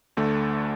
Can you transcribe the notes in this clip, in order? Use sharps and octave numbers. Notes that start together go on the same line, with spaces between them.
D2 D3 A3